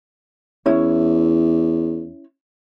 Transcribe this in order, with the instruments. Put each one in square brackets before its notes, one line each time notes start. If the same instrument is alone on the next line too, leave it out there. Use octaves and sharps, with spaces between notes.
[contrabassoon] E2 [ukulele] C#4 E4 C#5